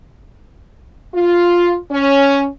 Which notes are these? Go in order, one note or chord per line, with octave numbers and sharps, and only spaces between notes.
F4
C#4